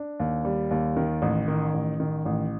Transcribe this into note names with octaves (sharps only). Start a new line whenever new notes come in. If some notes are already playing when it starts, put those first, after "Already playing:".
Already playing: D4
D#2
G3
D#2
D#3
A1
D#3
A1
D#3
A1